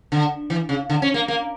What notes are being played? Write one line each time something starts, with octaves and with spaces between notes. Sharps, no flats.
D3
E3
C#3
D3
C#4
A#3
A#3